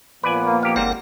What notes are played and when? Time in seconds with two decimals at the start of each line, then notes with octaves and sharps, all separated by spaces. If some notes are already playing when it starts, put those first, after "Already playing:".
0.23 A#2 F3 B3 B4 D5 G#5
0.46 A#3
0.63 F2 A#3 G4 F5
0.76 F#1 G#2 G3 C4 A#4 F#5